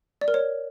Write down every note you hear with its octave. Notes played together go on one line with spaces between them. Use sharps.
D5
A#4
C#5